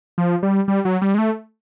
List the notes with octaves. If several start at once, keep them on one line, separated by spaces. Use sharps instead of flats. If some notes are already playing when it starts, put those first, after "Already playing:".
F3
G3
G3
F#3
G3
G#3
A3